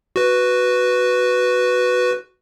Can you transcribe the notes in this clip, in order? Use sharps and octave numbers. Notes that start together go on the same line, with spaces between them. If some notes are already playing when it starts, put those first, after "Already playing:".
F#4 B4